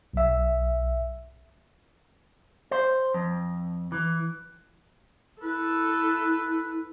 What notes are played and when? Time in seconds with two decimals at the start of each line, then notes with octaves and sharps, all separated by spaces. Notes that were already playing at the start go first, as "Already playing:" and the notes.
0.13 B1 E5
2.71 C5
3.14 F2
3.92 E3
5.43 E4 A4 B4